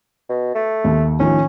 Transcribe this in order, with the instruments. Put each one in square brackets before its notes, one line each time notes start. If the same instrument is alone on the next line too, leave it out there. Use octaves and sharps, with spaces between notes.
[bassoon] B2
A3
[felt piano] D#2
[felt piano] A2 D#3 F3 [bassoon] C#4